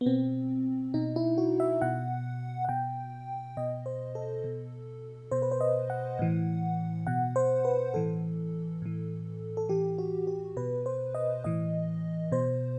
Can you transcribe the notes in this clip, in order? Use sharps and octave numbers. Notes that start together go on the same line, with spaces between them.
B3
B2 C4
B2 D#4
E4
F#4
E5
B2 F#5
F#5
B2 G5
B2 D#5
C5
A4
B2
B2 C5
B4
C5
D#5
F#5
A2 E3
B2 F#5
C5
B4
A2 E3 A4
A2 E3
A4
A2 E3 G4
F#4
G4
B2 B4
C5
D#5
A2 E3 D#5
B2 C5